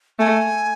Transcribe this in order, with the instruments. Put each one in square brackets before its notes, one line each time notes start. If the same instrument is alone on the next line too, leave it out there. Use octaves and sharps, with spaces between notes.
[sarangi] A3 [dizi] G#5